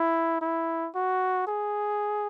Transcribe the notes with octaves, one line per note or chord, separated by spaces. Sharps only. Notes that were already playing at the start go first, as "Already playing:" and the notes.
Already playing: E4
E4
F#4
G#4